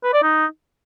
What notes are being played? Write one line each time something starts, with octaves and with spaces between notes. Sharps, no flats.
B4
D5
D#4